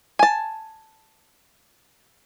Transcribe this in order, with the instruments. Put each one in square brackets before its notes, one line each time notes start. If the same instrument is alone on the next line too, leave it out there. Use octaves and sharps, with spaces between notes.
[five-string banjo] G#5 A5